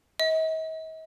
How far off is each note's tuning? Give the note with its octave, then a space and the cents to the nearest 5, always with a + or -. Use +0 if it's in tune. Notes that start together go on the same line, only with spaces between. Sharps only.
D#5 +45